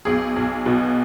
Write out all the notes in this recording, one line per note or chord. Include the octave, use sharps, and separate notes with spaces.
B1 G#4
B1
B2